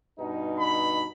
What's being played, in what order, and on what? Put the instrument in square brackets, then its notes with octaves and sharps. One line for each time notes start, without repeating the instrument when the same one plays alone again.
[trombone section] G2 B2 D#4
[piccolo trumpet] B5